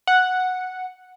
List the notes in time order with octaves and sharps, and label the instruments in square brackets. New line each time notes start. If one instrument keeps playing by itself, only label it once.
[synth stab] F#5